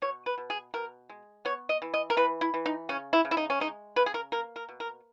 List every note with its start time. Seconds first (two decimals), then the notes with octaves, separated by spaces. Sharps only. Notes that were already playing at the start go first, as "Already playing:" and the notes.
0.02 B2 C#5
0.26 B4
0.38 B2
0.50 G#4
0.74 B2 A#4
1.09 G#3
1.45 B3 C#5
1.69 D#5
1.82 E3
1.94 D#5
2.10 A#4
2.17 E3 B4
2.41 E4
2.54 E3
2.66 D#4
2.89 C#3 C#4
3.13 E4
3.25 C#3
3.31 E4
3.37 D#4
3.50 C#4
3.60 G#3 D#4
3.96 C#3 B4
4.06 G#4
4.14 A#4
4.32 A#3 A#4
4.56 A#4
4.69 B2
4.80 A#4